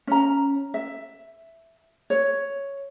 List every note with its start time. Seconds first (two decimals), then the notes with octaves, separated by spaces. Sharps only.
0.07 C#4 A#5
0.74 E5
2.10 C#5